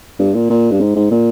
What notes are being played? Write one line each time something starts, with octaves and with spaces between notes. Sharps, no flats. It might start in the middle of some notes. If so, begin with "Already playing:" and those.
G2
A#2
A#2
G2
G#2
G#2
A#2